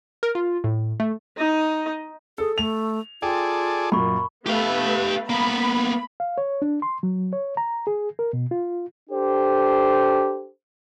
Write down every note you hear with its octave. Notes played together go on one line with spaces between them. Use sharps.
A#4
F4
A2
A3
D#4 D#5
G#4 A4
A3 F7
F4 G#4 A4 D5 G5
F#2 A#2 B5 C#6
A3 B3 G4 B4 F5
A#3 B3 B5
F5
C#5
D4
C6
F#3
C#5
A#5
G#4
A#4
B2
F4
D4 G4 A4 C5